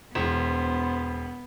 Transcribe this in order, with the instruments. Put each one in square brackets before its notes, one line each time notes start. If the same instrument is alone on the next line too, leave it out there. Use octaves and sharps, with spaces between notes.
[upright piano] E1 [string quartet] B3 [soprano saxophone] C5